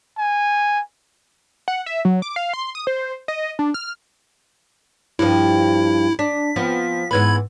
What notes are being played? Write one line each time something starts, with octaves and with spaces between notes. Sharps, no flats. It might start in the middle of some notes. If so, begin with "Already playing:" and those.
G#5
F#5
E5
F#3
D6
F5
C6
D#6
C5
D#5
D4
F6
G2 F3 E4
D4 B6
F3 B3 C4
G#2 E3 B3 B5 G#6